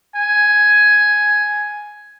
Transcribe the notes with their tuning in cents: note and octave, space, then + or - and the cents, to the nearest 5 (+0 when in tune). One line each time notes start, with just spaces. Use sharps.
G#5 +5